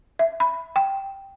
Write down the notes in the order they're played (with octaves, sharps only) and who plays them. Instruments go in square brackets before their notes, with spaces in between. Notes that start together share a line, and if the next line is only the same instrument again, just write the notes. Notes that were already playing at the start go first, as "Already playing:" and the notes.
[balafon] E5
B5
G5